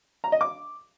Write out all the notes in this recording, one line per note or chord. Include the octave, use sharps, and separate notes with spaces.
A#5
D#5
D6